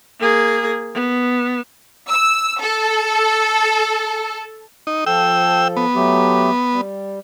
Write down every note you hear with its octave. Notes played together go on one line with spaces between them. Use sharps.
A#3 G#4
B3
E6
A4
D#4
F3 A4 G5 E6
B3
F#3 A3 G4
G3